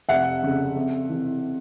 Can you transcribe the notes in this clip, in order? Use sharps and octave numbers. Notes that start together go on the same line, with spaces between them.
F1 E5 F#5
F2 C#3
F2
C3 E3